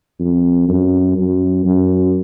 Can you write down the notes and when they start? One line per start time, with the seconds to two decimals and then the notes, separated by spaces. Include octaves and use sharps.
0.19 F2
0.69 F#2
1.17 F#2
1.65 F#2